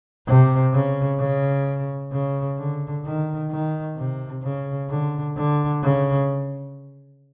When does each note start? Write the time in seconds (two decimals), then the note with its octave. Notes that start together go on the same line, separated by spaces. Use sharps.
0.27 C3
0.73 C#3
1.19 C#3
2.12 C#3
2.58 D3
3.05 D#3
3.50 D#3
3.97 C3
4.43 C#3
4.90 D3
5.36 D3
5.83 C#3